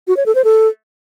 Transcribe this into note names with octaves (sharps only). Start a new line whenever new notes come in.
F#4
C#5
A4
C5
A4